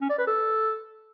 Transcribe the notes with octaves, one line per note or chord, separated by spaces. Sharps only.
C#4
D5
B4
A4